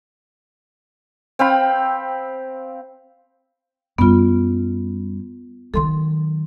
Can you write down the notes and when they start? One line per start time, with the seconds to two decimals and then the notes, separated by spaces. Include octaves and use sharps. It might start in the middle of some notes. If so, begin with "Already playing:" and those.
1.39 C4 F5 G5 B5
3.98 F#2 G3 B3 F4
5.74 D#3 F#3 A4 C6